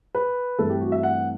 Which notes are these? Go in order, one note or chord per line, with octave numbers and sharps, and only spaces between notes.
B4
G2 E3 A3 C4 A4
G4
F#4
E5
F#5